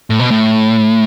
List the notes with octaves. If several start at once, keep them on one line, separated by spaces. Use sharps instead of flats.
A2
B2
A2